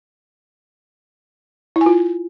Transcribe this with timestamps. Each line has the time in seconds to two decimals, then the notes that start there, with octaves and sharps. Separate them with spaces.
1.76 E4
1.81 G#5
1.86 F4